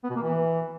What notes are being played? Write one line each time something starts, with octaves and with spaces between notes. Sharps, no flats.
B3
B2
A#3
E3